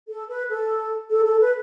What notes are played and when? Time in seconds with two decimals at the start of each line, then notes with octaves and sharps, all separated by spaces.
0.08 A4
0.29 B4
0.49 A4
1.10 A4
1.25 A4
1.41 B4